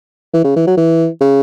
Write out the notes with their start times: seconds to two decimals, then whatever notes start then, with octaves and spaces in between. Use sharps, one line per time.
0.34 E3
0.44 C#3
0.56 E3
0.67 F#3
0.77 E3
1.21 C#3